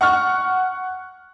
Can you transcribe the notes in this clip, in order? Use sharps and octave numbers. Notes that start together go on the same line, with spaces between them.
F#5 C#6 F6